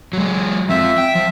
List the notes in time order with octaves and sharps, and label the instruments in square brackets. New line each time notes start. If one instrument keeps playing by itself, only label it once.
[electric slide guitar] F#3 G#3
[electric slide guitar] F3 C4 F4 [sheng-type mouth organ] E5
[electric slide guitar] G5
F3